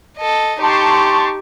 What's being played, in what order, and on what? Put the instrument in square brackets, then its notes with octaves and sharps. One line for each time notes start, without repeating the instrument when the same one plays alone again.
[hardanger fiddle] A4 D#5
[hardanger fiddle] D#4 G4 [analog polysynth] A5 C6 C#6